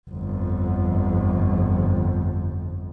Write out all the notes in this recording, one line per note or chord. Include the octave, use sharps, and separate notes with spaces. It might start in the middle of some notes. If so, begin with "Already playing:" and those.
G1 F2